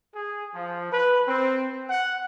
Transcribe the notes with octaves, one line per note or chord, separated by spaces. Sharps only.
G#4
F3
B4
C4
F#5